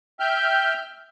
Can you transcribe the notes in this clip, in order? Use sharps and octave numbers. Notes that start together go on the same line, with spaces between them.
E5 G5 F6 G6